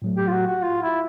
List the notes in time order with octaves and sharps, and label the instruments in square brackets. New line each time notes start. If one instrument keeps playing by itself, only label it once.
[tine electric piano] A2 F#3 A3
[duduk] G4
F4
F#4
F#4
F4
E4